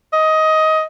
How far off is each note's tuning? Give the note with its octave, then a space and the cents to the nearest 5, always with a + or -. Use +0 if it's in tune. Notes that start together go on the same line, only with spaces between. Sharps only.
D#5 +15